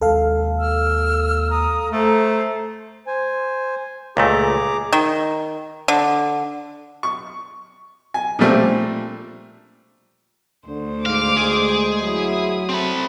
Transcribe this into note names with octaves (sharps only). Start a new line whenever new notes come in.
D#2 G#3 A4 F5
E6 F6
A#5 D#6
A3 C5 A#5
C5 G#5
C#2 A#2 A3 G#4 A#5 D6
D#3
D3
C#6
G#5
A#2 F3 G3 A3 C4 D4
D2 D3 C5
G#2 F5 D6
G#3 G#4
F#3 E4 E5 D#6
C4 A4 B5